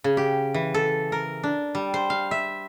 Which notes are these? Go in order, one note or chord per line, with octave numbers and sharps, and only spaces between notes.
C#3
G4
E3
A4
A#4
D4
G3
C5
F5
E5